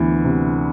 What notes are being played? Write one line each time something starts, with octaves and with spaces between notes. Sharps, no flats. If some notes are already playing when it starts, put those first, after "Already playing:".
Already playing: D2 E3 B3
C3